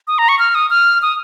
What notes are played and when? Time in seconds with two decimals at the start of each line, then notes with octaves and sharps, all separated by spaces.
0.07 D#6
0.18 A#5
0.29 C#6
0.39 F6
0.55 D#6
0.70 F6
1.02 D#6